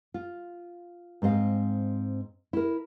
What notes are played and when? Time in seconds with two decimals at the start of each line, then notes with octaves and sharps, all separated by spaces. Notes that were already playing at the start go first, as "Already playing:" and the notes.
0.14 F4
1.22 G#2 C4 D#5 F5
2.53 E4 A#4